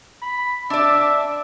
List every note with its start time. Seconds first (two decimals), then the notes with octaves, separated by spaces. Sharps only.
0.22 B5
0.70 D4 D5 E5